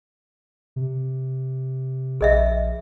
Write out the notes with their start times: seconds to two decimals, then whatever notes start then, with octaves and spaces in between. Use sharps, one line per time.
0.76 C3
2.21 A#1 G#4 D#5 E5